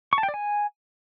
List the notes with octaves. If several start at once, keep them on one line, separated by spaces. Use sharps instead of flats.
C#6
A5
G5
D5
G#5